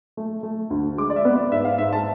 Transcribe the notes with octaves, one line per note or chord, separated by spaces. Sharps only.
A3
A3
D2
G#3 D6
D5
E5
B3
D5
G#2 E5
F5
G#2 E5
A5